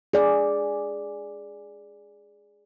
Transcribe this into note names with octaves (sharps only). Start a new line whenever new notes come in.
G#4 D5